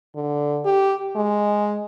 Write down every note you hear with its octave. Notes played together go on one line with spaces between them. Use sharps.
D3
G4
G#3